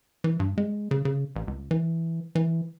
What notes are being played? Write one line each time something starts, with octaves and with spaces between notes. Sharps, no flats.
E3
G2
G#3
C#3
C#3
A1
C#2
E3
E3